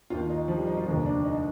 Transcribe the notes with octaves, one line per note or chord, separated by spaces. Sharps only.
D#2 D#3 F4
D#4
F3
G3
D#4
F4
F1 D#2 D3 F3 D#4
D4
D#4